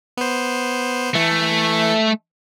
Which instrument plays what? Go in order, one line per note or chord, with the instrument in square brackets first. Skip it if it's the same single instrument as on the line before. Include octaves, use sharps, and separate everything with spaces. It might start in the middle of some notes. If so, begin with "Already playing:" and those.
[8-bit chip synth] B3 C5
[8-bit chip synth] E3 [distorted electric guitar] A3